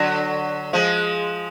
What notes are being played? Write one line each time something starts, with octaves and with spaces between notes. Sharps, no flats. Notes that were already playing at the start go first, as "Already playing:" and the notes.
Already playing: D3 F#3
F3 G#3